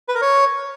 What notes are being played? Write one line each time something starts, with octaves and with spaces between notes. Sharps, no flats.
B4
A#4
C#5